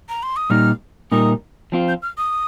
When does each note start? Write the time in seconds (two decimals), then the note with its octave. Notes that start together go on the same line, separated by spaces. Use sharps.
0.09 A#5
0.23 C6
0.36 D#6
0.50 A#2 G3 D#4 F6
1.11 A#2 G3 D#4 A#4 D#6
1.72 F3 C4 F4
1.88 G6
2.02 F6
2.18 D#6